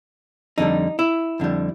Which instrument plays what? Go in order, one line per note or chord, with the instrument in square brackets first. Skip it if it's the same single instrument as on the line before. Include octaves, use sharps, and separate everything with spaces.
[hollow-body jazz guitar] F2 D3 G3 D#4
E4
F2 D3 G3